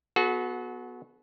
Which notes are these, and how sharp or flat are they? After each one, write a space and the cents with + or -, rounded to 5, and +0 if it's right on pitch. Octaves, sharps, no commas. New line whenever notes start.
B3 +0 F#4 -15 A4 -45